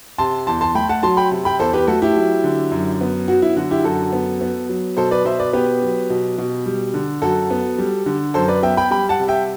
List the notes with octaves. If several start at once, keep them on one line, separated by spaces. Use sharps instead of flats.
C3 A5 C6
E2 A5 C6
A5 C6
A3 G5 B5
F#5 A5
F#3 A5 C6
G5 B5
C3
G5 B5
E2 A4 C5
G4 B4
A3 F#4 A4
E4 G4
F#3
D3
F#2
B3
F#3 F#4
E4
D3 F#4
E4 G4
F#2 F#4 A4
B3
B3
F#3
B2 A4 C5
B4 D5
B2 C5 E5
B4 D5
B3 G4 B4
F#3
B2
B2
G3
D3
F#2 F#4 A4
B3
G3
D3
F#2 A4 C5
B4 D5
B3 E5 G5
G5 B5
G3 G5 B5
F#5 A5
C3
E5 G5